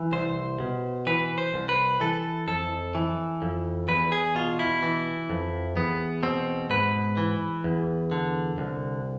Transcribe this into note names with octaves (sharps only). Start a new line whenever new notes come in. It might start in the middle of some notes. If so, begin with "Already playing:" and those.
Already playing: E3
C2 C5
B2
E3 B4
C5
C2
B4
E3 A4
F2 A4
E3
F2
E2 B4
G#4
B2 F4
E4
E3
F2
E2 B3
B2 C4
G#2 B4
E3
E2
D3
C2